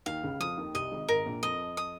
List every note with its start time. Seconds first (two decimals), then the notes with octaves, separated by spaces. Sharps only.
0.06 D#2 D#3 F5
0.23 C#2 C#3
0.40 F2 F3 D#6
0.57 D#2 D#3
0.74 C2 C3 D#5
0.91 G#1 G#2
1.08 G#1 G#2 A#4
1.26 A#1 A#2
1.43 F2 F3 D#5
1.77 D#6